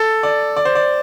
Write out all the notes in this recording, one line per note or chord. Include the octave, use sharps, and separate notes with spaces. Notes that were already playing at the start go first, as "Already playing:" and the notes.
Already playing: A4
D5
D5
C5
D5